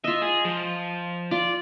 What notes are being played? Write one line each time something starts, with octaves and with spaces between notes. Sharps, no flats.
F4 D#5 E5
G#4
F3
F4 D5